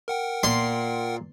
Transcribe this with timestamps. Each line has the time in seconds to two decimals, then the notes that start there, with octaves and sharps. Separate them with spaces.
0.08 A#4 F#5 G5
0.43 A#2 C6